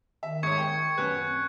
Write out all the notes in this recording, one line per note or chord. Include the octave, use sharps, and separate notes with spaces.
D#3 E5
G#2 C#5 C#6 G#6 C#7
G5
F#2 B4 F#6
C4